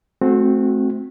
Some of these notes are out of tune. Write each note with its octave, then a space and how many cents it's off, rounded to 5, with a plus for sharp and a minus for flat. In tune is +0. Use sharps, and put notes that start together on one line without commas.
A3 -30 C4 +0 F#4 -15